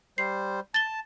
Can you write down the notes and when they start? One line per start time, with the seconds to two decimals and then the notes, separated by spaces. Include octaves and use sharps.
0.18 G3 C5 C7
0.74 A5 A6 G7